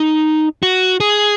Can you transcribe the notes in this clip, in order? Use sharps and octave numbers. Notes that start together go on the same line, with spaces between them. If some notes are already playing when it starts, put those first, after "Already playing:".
Already playing: D#4
F#4
G#4